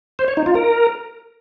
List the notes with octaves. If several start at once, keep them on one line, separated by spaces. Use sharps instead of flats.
C5
C#5
D#4
F4
A#4